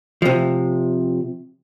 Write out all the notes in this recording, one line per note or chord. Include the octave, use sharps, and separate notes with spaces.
C3 F3